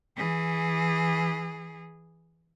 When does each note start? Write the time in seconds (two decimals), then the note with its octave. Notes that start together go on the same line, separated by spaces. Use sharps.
0.16 E3 G#4